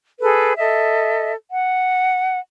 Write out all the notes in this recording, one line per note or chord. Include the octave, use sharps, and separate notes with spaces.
G#4 A4 B4
A4 D#5 E5
F#5